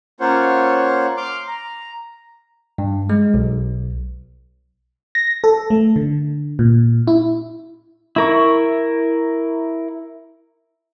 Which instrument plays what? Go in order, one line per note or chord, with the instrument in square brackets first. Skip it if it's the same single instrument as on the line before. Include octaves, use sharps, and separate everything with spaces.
[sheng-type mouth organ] A#3 C#4 F4 C5 C#5 F#5
C6 D6 F6
A#5
[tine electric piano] G2
G#3
B1
[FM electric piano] A#6
A4
A3
D3
A#2
E4
[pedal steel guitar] E4 A#4 C#6